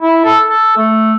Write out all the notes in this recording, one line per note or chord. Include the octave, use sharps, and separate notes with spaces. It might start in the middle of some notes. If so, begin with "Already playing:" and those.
E4
A4
A4
A3